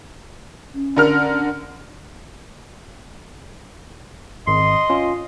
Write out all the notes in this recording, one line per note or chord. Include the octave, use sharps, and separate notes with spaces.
C#4
D3 A#4 F6
G#1 D#5 C6
C#4 F4